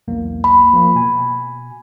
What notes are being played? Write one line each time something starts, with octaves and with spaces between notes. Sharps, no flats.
B1 E2 A#3
B5
F3 A#3
B2 G#5